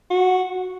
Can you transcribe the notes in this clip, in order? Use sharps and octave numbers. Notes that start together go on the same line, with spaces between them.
F#4